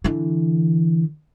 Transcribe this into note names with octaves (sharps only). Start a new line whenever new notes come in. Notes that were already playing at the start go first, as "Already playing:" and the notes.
D3 E3